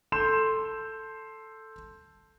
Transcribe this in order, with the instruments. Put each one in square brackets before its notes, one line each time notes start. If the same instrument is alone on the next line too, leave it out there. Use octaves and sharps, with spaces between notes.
[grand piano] A4 C6 G6 E7